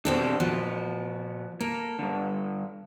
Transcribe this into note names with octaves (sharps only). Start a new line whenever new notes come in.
B2 C4 D4 G4 A4 C5
A#2 F3 F#4
A#3 A4
G2 D3